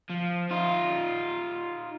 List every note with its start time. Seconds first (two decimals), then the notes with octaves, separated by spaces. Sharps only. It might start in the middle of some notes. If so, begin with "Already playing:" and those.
0.10 F3
0.51 D#4 F4